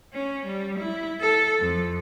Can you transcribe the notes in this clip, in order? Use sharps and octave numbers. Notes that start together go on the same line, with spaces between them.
C#4
G3
E4
A4
F2